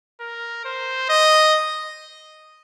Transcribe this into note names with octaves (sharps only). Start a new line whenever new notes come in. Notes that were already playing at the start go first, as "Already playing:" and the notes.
A#4
C5
D#5